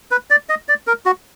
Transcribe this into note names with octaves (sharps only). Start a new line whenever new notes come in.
B4
D5
D#5
D5
A#4
F#4